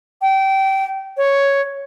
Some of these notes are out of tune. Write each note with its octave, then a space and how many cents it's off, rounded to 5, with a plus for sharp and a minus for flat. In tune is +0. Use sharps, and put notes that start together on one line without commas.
G5 -25
C#5 +0